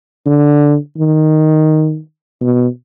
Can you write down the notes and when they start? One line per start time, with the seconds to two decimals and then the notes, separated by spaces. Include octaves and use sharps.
0.26 D3
0.98 D#3
2.41 B2